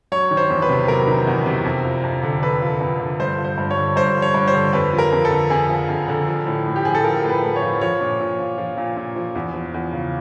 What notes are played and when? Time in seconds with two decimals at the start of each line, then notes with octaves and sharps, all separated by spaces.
0.12 F#3 C#5
0.31 D#3
0.37 C5
0.50 E2
0.62 B4
0.69 C3
0.88 F#3 A#4
1.07 D#3
1.27 E2
1.46 C3
1.65 F2
1.85 F3
2.04 F2
2.23 D3
2.42 F2 B4
2.62 F3
2.81 F2
3.00 D3
3.20 G2 C5
3.38 F3
3.44 C5
3.58 G2
3.71 C#5
3.77 D3
3.96 G2 C5
4.16 F3
4.22 C#5
4.34 G2
4.48 C5
4.54 D3
4.73 F2 B4
4.93 F3
4.98 A#4
5.12 F2
5.25 A4
5.31 D3
5.50 F2 G#4
5.69 F3
5.89 F2
6.08 D3
6.28 F3
6.46 A2
6.66 A2
6.76 G4
6.85 F3 G#4
6.95 A4
7.04 F3 A#4
7.24 A2
7.30 B4
7.43 A2
7.56 C#5
7.62 F3
7.81 F3 C#5
8.01 A#2
8.20 A#2
8.39 F3
8.58 F3
8.77 A#2
8.97 A#2
9.16 F3
9.35 E2
9.54 F3
9.74 E2
9.93 C#3